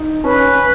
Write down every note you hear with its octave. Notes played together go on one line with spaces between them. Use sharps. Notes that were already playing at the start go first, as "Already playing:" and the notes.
Already playing: D#4
C#4 B4